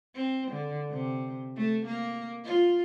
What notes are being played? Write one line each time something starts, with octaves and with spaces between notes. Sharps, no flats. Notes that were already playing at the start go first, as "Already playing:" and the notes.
C4
D3
C3
A3
A#3
F4